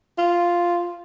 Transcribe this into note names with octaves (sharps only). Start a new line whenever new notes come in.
F4